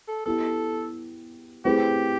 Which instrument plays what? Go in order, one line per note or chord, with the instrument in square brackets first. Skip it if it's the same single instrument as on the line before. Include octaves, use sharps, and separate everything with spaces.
[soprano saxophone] A4
[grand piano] B3 E4 G4 [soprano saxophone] A4
[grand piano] A3 C4 E4 G#4 B4 [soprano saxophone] G4